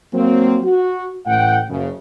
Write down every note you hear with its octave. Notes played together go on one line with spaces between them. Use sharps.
F#3 A#3 C4
F#4
A1 A2 F#5 G5
F#1 C#3